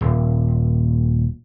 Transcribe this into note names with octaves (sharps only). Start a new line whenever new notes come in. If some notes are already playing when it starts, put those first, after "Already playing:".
D#1